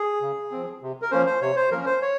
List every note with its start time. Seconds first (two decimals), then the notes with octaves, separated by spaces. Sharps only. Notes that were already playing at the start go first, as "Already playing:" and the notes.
Already playing: G#4
0.21 C#3
0.51 F3 C4
0.82 C3
1.02 A#4
1.11 F3 A#3 C#4 C5
1.26 C5
1.41 C3 C#5
1.56 C5
1.71 F3 A#3 C#4 A#4
1.86 C5
2.02 C#5